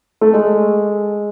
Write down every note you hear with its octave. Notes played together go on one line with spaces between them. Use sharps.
A3
G#3